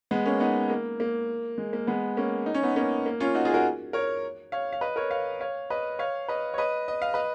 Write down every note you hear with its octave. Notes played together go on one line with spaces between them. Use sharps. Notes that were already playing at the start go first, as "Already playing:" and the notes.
G#3 B3
A#3 C#4
B3 D#4
A#3
A#3
G#3
A#3
G#3 B3
A#3 C#4
D#4
C#4
B3 D#4
A#3 C#4
A#3
C#4 F4
D#4 F#4
F4 G#4
F#4 A#4
A#4 C#5
C#5 F5
F5
B4 D#5
A#4 C#5
C#5 F5
C#5 F5
B4 D#5
C#5 F5
B4 D#5
C#5
B4 D#5
D#5
F5
B4 D#5